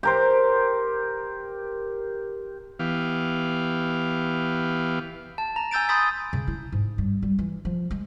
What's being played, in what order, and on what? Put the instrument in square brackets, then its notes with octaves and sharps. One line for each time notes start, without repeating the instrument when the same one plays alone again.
[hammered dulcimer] G4 A#4 C5
[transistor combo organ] E3 B3 G4 F5
[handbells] A5
A#5
G#5 E6 G6 A6 D7
B5 C6 D#6 G6 A6 B6
[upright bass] C#3
E4
G#2
G2
G3
E3
F3
G#3